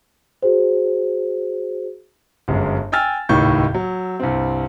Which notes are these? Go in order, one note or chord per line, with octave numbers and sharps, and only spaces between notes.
F#4 G#4 C5
G1 F#2 G#3
G5 G#5 E6 F6 A6
D#1 C#2 A2 D#3 C#6 G6
F#3
C2 G2 C4